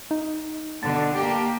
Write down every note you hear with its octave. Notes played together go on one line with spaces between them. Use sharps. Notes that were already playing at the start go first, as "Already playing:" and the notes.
D#4
B2 D3 A5
A#3 G4